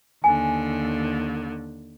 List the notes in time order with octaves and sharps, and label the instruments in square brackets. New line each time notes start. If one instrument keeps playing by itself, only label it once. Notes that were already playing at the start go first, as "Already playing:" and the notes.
[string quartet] D#2 D3 [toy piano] G#5